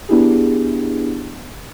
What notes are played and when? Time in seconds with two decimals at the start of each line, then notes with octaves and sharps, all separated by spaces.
0.09 B3 D4 E4 G4 G#4